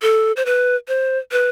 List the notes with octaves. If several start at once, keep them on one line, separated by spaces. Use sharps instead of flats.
A4
C5
B4
C5
B4